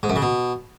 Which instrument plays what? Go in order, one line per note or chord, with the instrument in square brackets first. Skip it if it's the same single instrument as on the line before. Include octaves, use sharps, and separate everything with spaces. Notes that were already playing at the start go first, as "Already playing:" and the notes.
[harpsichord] G#2
F#2
C#3
B2